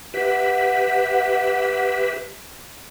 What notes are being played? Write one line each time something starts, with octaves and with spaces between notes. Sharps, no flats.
G4 B4 E5 F#5